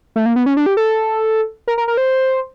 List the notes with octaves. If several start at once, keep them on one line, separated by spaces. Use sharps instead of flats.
A3
A#3
B3
C#4
D4
G4
A4
A#4
A#4
A#4
C5